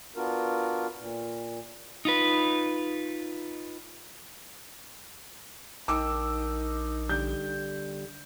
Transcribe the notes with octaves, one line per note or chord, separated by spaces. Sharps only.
B3 D4 F4 F#4 A#4
A#2
D#4 F4 B4
A#1 D#4 A#4 G5 A5 D6 E6
D3 G3 G6